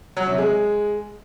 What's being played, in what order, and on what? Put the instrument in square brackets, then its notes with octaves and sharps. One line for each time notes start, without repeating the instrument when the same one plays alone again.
[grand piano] F#3
C3
G#3